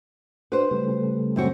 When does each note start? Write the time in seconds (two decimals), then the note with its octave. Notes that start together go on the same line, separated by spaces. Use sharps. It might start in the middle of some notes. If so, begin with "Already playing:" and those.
0.52 D4 F#4 B4 C5
0.71 C#3 G3 A3
1.36 F#2 C4 F#4